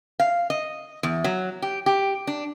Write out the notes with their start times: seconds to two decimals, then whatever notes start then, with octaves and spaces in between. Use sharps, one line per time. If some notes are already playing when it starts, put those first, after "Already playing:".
0.20 F5
0.50 D#5
1.03 E2
1.24 F#3
1.62 G4
1.86 G4
2.27 D4